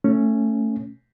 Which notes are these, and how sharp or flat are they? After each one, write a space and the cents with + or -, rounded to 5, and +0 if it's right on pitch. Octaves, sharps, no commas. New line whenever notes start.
A3 +15 C#4 +0